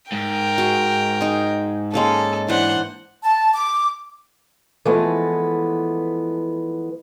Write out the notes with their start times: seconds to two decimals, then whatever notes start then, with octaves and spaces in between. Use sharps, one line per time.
0.12 G#2 A#4 G5
0.58 F#4 G#4
1.21 D#4 G#4
1.94 G#3 A#3 C#4 A4
2.48 E3 D4 C5 F#5
3.23 A5
3.53 D6
4.85 E3 F3 G#3 A3 B3